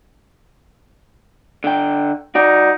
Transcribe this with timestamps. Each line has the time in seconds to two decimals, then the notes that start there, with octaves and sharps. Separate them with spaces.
1.64 D3 G5
2.35 D#4 F#4 D5